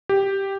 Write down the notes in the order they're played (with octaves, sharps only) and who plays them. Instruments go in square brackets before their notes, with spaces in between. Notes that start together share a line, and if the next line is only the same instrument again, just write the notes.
[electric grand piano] G4